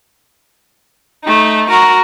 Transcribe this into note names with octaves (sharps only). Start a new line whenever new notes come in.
A3 D#4
F#4 A#4